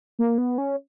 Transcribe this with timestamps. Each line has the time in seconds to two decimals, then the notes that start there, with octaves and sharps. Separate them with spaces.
0.19 A#3
0.38 B3
0.58 C#4